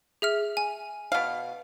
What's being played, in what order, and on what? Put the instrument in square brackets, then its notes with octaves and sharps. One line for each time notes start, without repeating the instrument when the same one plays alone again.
[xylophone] G#4 E5 F6
G#5
[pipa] B2 F5